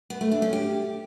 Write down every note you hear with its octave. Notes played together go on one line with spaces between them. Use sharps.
B3
A3
D4
C#4
G4